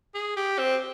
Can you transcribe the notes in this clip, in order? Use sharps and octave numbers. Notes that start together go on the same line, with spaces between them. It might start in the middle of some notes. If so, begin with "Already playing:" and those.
G#4
G4
C4